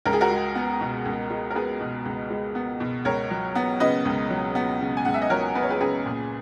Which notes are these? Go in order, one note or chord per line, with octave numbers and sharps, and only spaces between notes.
C#2 A#4
G#4
F#4 A#4
G#3
B3
B2
C#2
G#3
A#4
B3 G#4 B4
B2
C#2
G#3
B3
B2
C#2 A#4 C#5
F#3
B3
C#3 B4 D#5
C#2
F#3
B3
C#3
G#5
C#2 F#5
E5
D#5
F#3 A#4 C#5
B3 B4
C#5
G#4 B4
C#3 G#4 B4
A#2